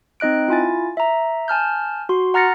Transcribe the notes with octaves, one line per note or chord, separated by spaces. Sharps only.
C4 D#4 D#5 F#6 D7
E4 F4 G#5 A6
E5 A#5
G#5 A5 F6 G6
F#4 C6
F#5 A#5 F6 A6 A#6 C#7